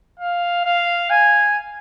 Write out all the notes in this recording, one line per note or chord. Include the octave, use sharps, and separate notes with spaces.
F5
F5
G#5